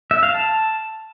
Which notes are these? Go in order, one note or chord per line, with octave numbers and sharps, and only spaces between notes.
E5
F5
A5